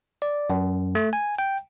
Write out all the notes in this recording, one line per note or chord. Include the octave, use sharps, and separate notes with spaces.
D5
F#2
A3
G#5
G5